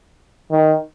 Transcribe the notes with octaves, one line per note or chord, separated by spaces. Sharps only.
D#3